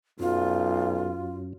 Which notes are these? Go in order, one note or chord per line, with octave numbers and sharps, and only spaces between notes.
B1 F#2 F4